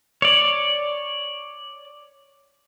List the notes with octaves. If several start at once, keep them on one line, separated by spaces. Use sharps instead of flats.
C#5 D5